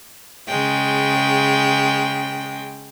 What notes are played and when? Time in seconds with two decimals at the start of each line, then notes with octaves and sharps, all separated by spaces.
0.46 C#3 G#3 G5